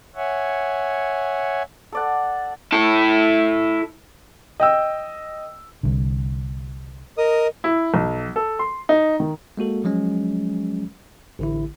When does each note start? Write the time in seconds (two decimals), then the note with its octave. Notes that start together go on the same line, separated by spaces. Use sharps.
0.16 C#5 E5 F#5 G#5
1.92 A4 D5 F#5
2.73 E4 A4
4.60 D#5 G5 E6
5.83 C2 D3
7.18 A#4 D#5 D#6
7.64 E4
7.94 B1
8.36 A4
8.59 C6
8.89 D#4
9.20 D#3
9.57 G#3 A#3 F#4 A4
9.84 F3 F#3 G#3 C#4
11.39 A1 D3 E4